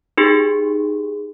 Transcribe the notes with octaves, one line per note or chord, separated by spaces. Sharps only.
D#4 G4 G#4